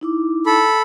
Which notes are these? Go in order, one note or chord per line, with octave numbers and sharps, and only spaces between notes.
D#4 E4 D6
A4 B5